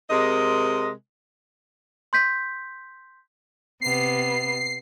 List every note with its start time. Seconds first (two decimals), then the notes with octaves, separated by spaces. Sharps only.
0.10 C3 G#3 A#4 D#5
2.13 C6 G6 B6
3.81 C3 B3 C7